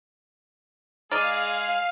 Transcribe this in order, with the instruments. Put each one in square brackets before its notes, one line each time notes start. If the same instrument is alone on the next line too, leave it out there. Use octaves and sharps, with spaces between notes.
[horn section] G#3 G#4 [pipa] D#4 D5 [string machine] F5 [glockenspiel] F6 D#7